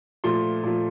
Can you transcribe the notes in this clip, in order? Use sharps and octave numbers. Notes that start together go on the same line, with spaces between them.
A#2 F3 A3 C6
A#2 F3 A3